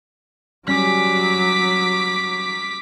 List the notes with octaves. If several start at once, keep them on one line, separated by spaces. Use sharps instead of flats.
F#3 G3 C#4 D6 B6